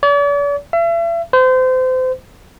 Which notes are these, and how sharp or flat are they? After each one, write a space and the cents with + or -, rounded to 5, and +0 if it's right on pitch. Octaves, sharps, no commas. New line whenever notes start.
D5 -45
E5 +40
C5 -30